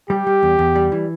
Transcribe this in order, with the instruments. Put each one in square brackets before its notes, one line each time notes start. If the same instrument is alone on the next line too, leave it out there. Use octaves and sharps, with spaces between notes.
[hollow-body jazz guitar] G3 [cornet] G4
[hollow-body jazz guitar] G3
E2
E2
G3
E3